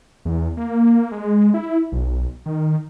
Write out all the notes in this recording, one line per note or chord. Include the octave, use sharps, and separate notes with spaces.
E2
A#3
G#3
E4
B1
D#3